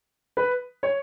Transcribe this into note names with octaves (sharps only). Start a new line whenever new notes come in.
B4
C#5